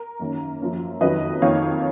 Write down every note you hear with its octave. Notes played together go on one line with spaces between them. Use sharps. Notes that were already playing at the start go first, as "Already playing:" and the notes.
Already playing: A#4
F#2 D#3 A#3 C#4
F#2 F3 A#3 C#4
F2 D#3 F#3 B4 D#5
F2 D#3 A#3 C#5 F5